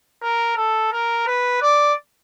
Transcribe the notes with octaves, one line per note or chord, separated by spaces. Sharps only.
A#4
A4
A#4
B4
D5